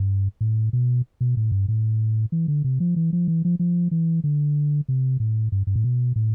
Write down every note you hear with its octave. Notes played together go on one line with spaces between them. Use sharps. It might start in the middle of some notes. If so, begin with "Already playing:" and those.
Already playing: G2
A2
B2
B2
A2
G2
A2
E3
D3
C3
F3
E3
F3
E3
F3
F3
E3
D3
C3
A2
G2
G2
A2
B2
A2